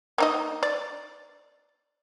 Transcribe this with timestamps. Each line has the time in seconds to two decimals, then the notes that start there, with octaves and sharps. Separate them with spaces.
0.18 A#3 D#4 D#5
0.63 D5